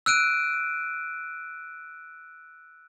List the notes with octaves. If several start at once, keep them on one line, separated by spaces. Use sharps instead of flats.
E6 F#6 D7 D#7